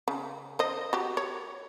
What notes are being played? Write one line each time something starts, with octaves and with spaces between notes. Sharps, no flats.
C#3
C5 D#5
F#4 G4
C#5